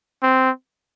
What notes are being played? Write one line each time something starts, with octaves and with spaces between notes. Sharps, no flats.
C4